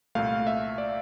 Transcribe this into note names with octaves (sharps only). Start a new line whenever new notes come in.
C2 A#2 A3 F5
E5
D5